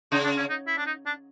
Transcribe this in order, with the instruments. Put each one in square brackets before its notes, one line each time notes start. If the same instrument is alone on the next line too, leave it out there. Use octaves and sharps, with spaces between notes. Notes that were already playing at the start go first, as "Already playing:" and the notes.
[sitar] C#3 [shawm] D#4
[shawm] D4
C#4
D#4
E4
D4
D#4
D4